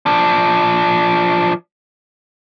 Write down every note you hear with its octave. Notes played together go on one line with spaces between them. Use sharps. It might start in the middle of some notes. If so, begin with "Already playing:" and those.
F3 D4